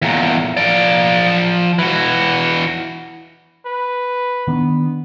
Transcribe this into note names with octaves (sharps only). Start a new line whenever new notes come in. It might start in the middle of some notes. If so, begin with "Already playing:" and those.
E2 A#2
F3 D5
E3 F#4
B4
D#3 B3 D4